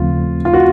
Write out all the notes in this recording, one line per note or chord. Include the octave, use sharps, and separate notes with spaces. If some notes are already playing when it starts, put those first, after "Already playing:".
Already playing: D#2 C#3 F3 A3 C4 F4
F4
F#4